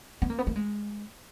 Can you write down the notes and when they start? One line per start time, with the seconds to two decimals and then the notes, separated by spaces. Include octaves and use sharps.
0.22 B3
0.30 A#3
0.38 B3
0.47 A#3
0.56 G#3